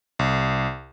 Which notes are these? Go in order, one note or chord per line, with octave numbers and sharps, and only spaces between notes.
C2